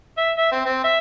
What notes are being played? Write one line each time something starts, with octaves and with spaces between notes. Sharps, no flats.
E5
E5
C4
C4
E5